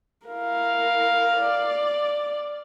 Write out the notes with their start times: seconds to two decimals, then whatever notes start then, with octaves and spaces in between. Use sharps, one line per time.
0.27 E4 A#4 F5
1.37 D5